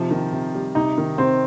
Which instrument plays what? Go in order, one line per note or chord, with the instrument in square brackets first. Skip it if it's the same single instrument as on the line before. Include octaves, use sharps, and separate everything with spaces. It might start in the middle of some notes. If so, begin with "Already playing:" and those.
Already playing: [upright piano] C3 D#4 [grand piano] F3
[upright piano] D#3
C3
G3
[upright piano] C3 [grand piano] D#4
[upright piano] D#3
[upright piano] C3 [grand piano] C4